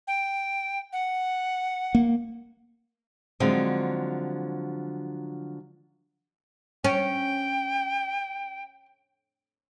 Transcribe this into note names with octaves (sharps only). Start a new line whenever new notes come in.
G5
F#5
A#3
D3 F3 F#3 G#3 C4
C#4 G5